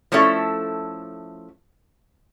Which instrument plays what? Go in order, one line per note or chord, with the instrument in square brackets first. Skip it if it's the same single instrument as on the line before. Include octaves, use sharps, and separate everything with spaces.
[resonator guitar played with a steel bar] F3 A3 C#4 E4 A4 E5